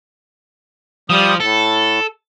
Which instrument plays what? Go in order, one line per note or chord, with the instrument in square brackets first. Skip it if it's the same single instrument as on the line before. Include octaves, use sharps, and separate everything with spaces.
[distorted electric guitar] F3 [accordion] G3 D#6
[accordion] A2 [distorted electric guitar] A4